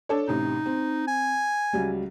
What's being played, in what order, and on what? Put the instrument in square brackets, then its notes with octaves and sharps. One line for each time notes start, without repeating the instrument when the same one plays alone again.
[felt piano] D4 A4 C#5
[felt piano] A1 C3 [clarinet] D#4
[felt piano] C4
[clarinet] G#5
[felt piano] C#2 F#3 G3